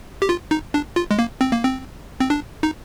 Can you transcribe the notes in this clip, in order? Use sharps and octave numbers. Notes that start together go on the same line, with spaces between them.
G4
F4
D#4
D4
F4
G#3
A#3
C4
A#3
C4
C4
D4
D#4